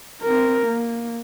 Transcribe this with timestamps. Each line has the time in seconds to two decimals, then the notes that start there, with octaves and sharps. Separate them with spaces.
0.22 C4 A#4
0.67 A#3